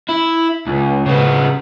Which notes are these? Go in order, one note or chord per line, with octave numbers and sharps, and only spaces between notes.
E4
C#2
C#3 B3